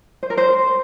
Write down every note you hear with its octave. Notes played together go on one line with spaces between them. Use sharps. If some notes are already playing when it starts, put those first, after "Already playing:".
C5
A#4
C5